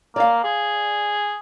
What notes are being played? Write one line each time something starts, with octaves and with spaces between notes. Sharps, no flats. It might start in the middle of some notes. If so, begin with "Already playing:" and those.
A#3 D5 F5
G#4